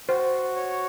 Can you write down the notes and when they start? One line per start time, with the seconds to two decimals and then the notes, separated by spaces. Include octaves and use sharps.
0.09 F#4 C5
0.56 C#5